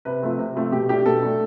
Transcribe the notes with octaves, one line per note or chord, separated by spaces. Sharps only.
C3 B4
F3 A3 C4
C3
F3 A3 C4
B2 G4
A3 D4 G4
B2 A4
A3 D4